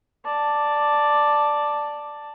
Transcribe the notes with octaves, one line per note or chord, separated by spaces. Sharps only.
D5 A5